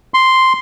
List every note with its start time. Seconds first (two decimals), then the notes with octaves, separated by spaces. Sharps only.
0.14 C6